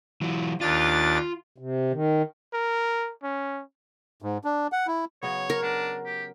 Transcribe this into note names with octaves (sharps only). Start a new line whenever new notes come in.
E3 F#3
D#2 D4 F4 A6
C3
D#3
A#4
C#4
G#2
D4
F#5
E4
C#3 F#3 B3 C#5
A#4
D4 F#4
G4